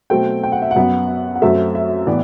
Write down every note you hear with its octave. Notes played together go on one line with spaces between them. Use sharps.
B2 F#3 A3 C4 G5
G5
F#5
E5
F#5
F#2 F#3 B3
F#5
F#2 F#3 A3 C4 E5
E5
A2 E3 B3 D5